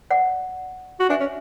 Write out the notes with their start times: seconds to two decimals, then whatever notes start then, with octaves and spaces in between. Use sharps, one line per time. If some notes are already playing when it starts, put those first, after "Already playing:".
0.10 D5 F#5
1.00 F#4
1.09 D4 E5 G#5
1.20 C#4